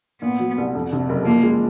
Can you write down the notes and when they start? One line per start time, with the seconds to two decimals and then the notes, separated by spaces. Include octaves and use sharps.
0.22 A#2 B3
0.40 F#3
0.58 C2
0.75 F2
0.93 C3
1.09 F#1
1.26 F3 A#3
1.43 G#3